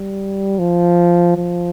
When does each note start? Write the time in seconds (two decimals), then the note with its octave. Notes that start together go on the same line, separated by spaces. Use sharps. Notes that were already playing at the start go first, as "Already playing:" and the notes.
Already playing: G3
0.59 F3
1.37 F3